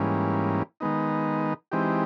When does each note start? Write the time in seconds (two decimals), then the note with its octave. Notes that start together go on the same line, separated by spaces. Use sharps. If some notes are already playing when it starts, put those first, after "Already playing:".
Already playing: G#2 E3 G3 A#3 C#4
0.80 D#3 G#3 B3 D#4
1.72 E3 G#3 C4 D#4 G4